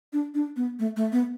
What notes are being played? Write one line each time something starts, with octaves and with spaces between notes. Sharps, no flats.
D4
D4
B3
A3
A3
B3